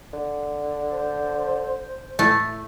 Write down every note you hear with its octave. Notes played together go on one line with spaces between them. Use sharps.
D3
C5
A2 A3